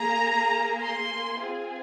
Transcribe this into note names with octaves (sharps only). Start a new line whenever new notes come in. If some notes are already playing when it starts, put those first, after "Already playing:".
Already playing: A#3 G#4 A#5
C6
C4 F4 G#4